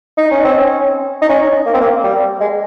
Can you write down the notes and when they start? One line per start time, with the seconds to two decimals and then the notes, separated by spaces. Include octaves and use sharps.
0.18 D#4
0.31 C#4
0.44 C4
0.59 C#4
1.22 D#4
1.29 C#4
1.66 A#3
1.74 C4
1.81 A#3
2.04 G3
2.40 G#3